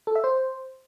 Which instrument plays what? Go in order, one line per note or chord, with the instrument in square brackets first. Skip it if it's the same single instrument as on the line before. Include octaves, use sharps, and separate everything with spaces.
[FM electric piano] A4
E5
C5